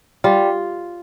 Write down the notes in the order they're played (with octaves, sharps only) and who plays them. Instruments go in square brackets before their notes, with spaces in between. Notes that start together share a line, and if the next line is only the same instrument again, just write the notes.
[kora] G3 F4